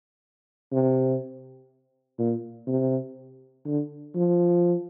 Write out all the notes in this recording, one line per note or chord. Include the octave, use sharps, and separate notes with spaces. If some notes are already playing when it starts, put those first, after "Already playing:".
C3
A#2
C3
D3
F3